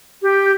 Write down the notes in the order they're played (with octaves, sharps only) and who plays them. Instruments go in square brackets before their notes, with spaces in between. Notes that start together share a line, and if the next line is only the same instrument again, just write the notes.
[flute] G4